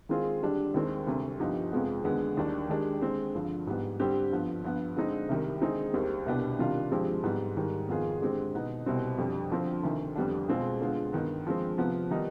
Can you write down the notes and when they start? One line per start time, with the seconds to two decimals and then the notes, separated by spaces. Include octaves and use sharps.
0.09 D#3 G#3 C4 F4 G#4
0.42 D3 G3 D4 G4
0.74 D#2 D#3 G#3 C4
1.07 D2 C3 G3
1.39 G2 F3 B3 D#4 G4
1.72 F2 C3 F3 G#3 B3
2.04 D#2 D3 G#3 B3
2.37 D#2 D#3 G3 D4
2.69 D#3 G#3 D4 G4
3.02 D3 G#3 C4
3.34 G2 D3 F3
3.67 G#2 G3 B3
4.00 D3 G3 C4 G4
4.31 G2 D3 F3 B3
4.64 G2 F3 B3
4.96 D3 G#3 C4 D#4
5.29 C2 C3 D#3 G3
5.61 D3 G#3 C4 D#4 G#4
5.93 D#2 D#3 G3 C4 G4
6.26 C2 B2 B3 D4 G4
6.59 C3 D#3 G3 D4 F4
6.91 G2 F3 G#3 C4 G4
7.24 G#2 G3 B3
7.57 G#2 D#3 G3
7.88 F2 D#3 B3 F4 G#4
8.21 D3 G#3 C4 G4
8.54 B2 B3 D#4
8.86 C2 B2 G3 C4
9.18 F2 D3 G3
9.51 D3 F3 C4
9.83 D2 C3 D#3
10.16 F2 D3 G3 B3 D4
10.48 B2 G#3 C4 F4 G#4
10.81 D3 G#3 B3 F4
11.13 G2 D#3 B3
11.46 D3 F3 G#3 C4
11.78 C3 F3 B3
12.11 D#3 G3 B3 D#4